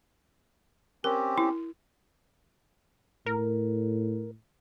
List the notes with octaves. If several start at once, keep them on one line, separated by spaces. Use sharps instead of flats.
C4 C#4 G4 A#4
E4
A2 A#4